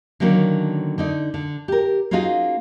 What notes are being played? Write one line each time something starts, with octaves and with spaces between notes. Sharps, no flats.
D3 D#3 F#3 A#3 C#4 D4
D3 D#4 D5
D3
G4 A#4
A#3 C#4 D#4 F4 F#4 G#4